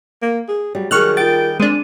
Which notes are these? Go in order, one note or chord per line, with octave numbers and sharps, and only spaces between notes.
A#3
G#4
F#3 G3
D#3 G3 G#4 C#6 F6 F#6
F4 A#4 G5 A6 D7
G#3 C4 D4 D#7